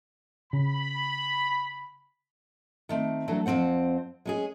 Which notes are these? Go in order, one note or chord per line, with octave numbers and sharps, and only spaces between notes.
C#3 B5
D#3 A3 C4
E3 F#3 A3 D4
F2 E3 C4 C5 F#5
G#3 C#4 G#4